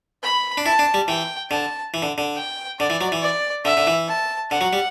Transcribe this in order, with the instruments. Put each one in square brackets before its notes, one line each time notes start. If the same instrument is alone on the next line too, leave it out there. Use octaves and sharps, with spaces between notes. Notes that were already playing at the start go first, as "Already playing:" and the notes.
[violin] B5
[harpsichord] D4
[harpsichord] E4 [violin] A5
[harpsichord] D4
G3
[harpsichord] E3 [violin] G5
[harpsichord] D3 [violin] A5
[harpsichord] E3
D3
D3
[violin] G5
[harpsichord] D3 [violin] D5
[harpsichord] E3
F#3
E3
[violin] D5
[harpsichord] D3 [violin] E5
[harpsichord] D3
E3
[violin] A5
[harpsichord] D3 [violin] F#5
[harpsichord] F#3
G3